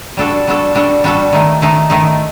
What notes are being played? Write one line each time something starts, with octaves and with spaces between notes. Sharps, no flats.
G3 D4 F#4 A4
G3 D4 F#4 A4
G3 D4 F#4 A4
G3 D4 F#4 A4
D#3 A3 D#4
D#3 A3 D#4
D#3 A3 D#4